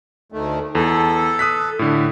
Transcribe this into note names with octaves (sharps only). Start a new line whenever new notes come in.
D2 D#3 A3
E2 A4
D#6 F#6 B6
A2 D3